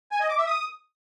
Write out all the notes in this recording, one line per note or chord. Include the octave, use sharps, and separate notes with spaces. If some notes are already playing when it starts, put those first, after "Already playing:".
G#5
D#5
D6
E5
D#6